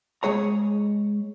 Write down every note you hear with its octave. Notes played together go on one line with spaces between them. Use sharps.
G#3 G#4 C#5 A#5